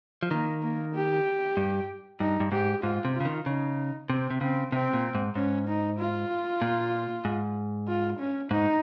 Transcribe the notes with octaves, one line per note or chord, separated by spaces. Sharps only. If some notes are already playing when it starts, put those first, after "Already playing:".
F3
D#3 A#3
A#3
G4
G2
G2 D#4
G2
G#2 G4
G#2 F4
C3
F4
C#3
D#3
C#3 D#4
C3 C4
C3
C#3 C4
C3 C4
A#2
G#2
G#2 C#4
D#4
F4
A#2
G#2
F4
C#4
G#2 D#4